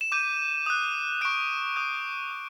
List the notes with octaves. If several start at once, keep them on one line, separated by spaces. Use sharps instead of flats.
E7
D6 G6 D#7
D#6 F#6
C#6 F#6 D7
D#6 G6
D#6